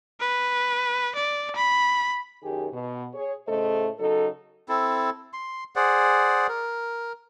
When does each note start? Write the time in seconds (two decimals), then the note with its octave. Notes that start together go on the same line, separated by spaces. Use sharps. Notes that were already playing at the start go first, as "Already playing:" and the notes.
0.20 B4
1.15 D5
1.56 B5
2.43 F#2 D#3 G4 G#4
2.73 B2
3.14 G#4 C#5
3.48 A2 C#3 A3 A4 C5 D#5
3.99 C#3 F#3 D#4 A4
4.69 C4 E4 A4
5.33 C6
5.76 G#4 C5 D5 F#5
6.49 A#4